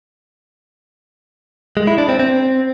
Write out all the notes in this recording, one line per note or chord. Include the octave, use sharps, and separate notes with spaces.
G#3
E4
D4
C4
C4